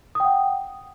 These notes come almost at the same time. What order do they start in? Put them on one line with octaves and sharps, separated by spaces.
D#6 G5 F#5